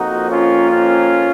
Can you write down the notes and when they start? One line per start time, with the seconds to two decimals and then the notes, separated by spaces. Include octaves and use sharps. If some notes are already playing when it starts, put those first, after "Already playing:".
Already playing: F2 F3 A#3 D#4 F#4
0.29 C#4 F4
0.70 C#4 F4